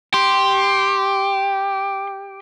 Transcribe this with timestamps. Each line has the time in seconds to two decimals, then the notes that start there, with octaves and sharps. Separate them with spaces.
0.14 G4 C6